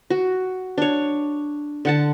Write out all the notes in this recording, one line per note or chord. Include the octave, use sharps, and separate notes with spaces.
F#4
D4 C#5
D3 F#5 A5